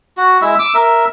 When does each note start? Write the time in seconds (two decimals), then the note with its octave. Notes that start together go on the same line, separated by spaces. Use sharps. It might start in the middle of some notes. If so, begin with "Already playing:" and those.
0.17 F#4
0.42 G#3 E4 E5
0.59 D6 E6
0.75 A#4 E5